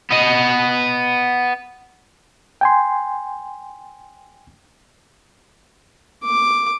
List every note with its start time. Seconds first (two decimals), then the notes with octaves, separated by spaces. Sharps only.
0.10 B3 D#5
2.61 G5 G#5 C6
6.25 D6